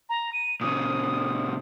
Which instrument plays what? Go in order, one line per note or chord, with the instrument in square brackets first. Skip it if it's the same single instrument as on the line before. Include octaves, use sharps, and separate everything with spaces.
[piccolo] A#5
D#7
[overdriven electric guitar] A#2 C#3 [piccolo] D#6